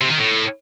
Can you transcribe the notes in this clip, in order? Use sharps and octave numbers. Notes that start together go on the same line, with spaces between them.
C3
D#3
A2